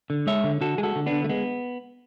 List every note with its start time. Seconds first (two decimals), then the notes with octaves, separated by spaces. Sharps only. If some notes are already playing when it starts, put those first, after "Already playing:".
0.10 D3
0.27 G#3 C#5 E5
0.44 D3
0.61 D3 F#4 A4
0.78 G#3 G#4
0.83 F#4 A4
0.96 D3
1.06 B3 D4
1.12 D3
1.24 A3
1.29 G#3 B3